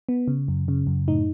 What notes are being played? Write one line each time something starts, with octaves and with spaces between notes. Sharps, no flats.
B3
C#3
F#2
C#3
F#2
A2 D#4